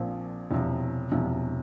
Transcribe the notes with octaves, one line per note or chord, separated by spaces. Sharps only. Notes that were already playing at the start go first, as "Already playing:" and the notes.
Already playing: A#1 A#2 F3 C4
E1 E2 C3 F3
E1 E2 C3 F3